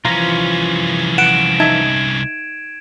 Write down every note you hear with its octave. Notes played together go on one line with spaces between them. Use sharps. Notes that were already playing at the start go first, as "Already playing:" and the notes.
C2 E3 F3 C#4 F4 A#5
F#5 D7 E7
D#4 E5 A5 G#6